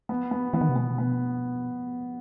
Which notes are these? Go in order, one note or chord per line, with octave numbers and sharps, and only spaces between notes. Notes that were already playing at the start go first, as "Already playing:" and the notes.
B3
B3
E3 B3
D#3
C3
B2 B3
B3